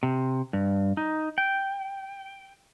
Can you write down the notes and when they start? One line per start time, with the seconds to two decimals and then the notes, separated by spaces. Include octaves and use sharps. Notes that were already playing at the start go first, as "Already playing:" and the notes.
0.03 C3
0.53 G2
0.97 D#4
1.38 G5